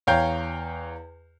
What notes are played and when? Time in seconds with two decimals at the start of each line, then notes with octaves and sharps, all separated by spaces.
0.07 E2 C#5 F5 G5 A#5 G6